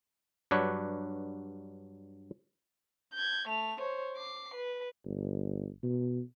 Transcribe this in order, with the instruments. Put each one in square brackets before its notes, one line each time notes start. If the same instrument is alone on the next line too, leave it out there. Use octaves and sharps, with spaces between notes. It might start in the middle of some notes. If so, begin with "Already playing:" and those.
[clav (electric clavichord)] G2 F#3 D4 B4 C#5
[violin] G6 G#6
A3 F7
C5 C#5
D6 C7
B4
[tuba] G1
B2